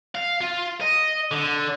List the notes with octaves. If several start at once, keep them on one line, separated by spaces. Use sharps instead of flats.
F5
F4
D#5
D3